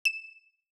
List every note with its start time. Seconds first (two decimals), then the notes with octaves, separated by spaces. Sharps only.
0.05 E7